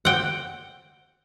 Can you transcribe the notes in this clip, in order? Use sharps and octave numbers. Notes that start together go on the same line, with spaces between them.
F#5 G5